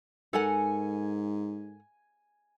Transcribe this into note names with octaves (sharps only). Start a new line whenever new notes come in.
G#2 A4 A#4 F#5 G#5